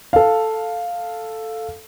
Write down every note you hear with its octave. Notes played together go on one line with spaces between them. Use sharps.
A4 F5